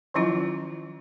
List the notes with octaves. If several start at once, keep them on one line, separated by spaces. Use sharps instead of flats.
D#3 F3 F#3 C#4 E4 F4